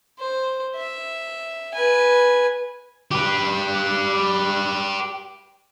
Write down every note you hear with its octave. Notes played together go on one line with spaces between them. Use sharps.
C5
E5
B4 G#5
G4 B4